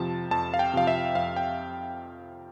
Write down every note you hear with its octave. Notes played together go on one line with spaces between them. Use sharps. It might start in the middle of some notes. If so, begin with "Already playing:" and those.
Already playing: F2 C3 F3 A5
F2 A5
F5
G5
C3 F3 F5
E5
F2 F5
G5